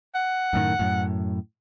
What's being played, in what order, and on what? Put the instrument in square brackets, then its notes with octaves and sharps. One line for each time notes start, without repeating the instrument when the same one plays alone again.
[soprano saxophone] F#5
[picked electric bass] F#2 A2 D#3
F#2 A2